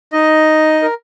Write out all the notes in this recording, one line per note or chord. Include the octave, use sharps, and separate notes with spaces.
D#4 D#5
A#4